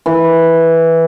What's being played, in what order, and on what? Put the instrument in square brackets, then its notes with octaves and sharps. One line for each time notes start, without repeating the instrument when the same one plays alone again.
[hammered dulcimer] E3